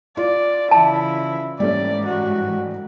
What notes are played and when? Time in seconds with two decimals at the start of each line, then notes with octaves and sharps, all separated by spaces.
0.17 F4 D5
0.71 C#3 E3 E4 A5
1.60 G#2 E3 G3 A3 C#4 D5
2.06 F#4